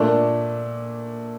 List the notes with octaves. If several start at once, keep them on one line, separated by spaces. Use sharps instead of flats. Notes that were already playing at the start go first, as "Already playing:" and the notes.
Already playing: A#2 A3 D4